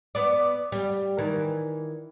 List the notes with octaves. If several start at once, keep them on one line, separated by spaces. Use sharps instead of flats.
B3 D5
G3
D#3 E3